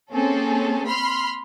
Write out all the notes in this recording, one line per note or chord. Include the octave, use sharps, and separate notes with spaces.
A#3 C4 C#4 G#4 A4
B5 C6 F6